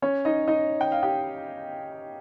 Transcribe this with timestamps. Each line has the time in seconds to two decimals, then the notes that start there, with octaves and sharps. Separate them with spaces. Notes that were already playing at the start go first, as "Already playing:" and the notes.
0.02 C#4 C#5
0.25 D#4 D#5
0.47 D#4 D#5
0.81 G5
0.92 F5
1.03 G4 G5